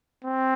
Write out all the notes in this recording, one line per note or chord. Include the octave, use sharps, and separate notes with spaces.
C4